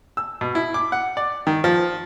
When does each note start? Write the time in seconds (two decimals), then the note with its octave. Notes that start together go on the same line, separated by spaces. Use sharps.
0.17 E6
0.41 B2
0.55 E4
0.74 D6
0.92 F#5
1.17 D5
1.47 D#3
1.64 F3